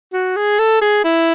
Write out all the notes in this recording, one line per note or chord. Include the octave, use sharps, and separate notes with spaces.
F#4
G#4
A4
G#4
E4